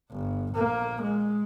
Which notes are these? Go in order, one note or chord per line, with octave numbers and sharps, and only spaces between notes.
G1
A#1 A#3
G#3